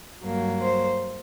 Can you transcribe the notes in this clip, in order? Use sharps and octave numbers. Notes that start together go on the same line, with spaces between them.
G2 F#3 A#3
C5